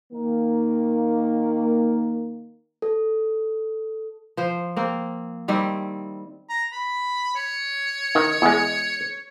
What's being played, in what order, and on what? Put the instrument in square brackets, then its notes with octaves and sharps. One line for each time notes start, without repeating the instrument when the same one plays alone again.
[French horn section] D#3 A#3
[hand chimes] A4
[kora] F3 C5
A#3 C4
D#3 G3 C4 E4
[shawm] A#5
B5
C#5
[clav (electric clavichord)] D#3
E2 G#3